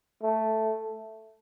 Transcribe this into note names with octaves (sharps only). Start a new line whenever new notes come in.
A3